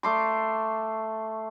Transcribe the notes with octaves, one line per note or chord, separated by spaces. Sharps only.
A3 C6 D6